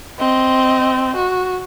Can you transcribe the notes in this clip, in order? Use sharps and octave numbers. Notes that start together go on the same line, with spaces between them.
C4 D#5
F#4